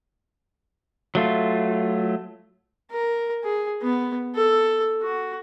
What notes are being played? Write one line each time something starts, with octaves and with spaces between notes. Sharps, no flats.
F#3 A3 F4
A#4
G#4
B3
A4
F#4